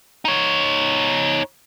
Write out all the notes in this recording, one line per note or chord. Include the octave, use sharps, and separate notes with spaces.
D#4 C#5